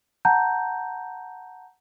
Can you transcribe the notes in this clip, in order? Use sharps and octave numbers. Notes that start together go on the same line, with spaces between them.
F#5 A5 A#5 G6